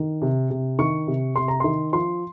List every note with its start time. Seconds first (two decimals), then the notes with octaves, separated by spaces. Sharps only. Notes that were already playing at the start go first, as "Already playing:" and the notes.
Already playing: D#3
0.22 C3
0.50 C3
0.79 D#3 C#6
1.07 C3
1.36 C3 C6
1.48 A#5
1.60 D#3 C6
1.93 F3 C6